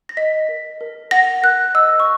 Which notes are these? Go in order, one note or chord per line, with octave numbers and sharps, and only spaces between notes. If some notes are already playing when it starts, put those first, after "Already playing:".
A#6
D#5 B6
A#4
A#4
F#5 A#6
A#4 F#6
D#5 E6
C#6